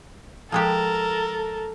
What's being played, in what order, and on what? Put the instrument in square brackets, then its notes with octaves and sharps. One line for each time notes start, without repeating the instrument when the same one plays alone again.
[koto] F3 G#3 G4 [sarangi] A4 [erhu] A#4